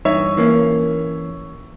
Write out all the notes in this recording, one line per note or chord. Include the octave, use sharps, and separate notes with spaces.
G2 E3 D#4 C#5 E5
E3 A#3 C#4